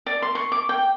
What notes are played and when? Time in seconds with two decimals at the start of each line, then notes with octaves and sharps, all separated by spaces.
0.06 D5
0.22 C6
0.35 C#6
0.52 D6
0.69 G5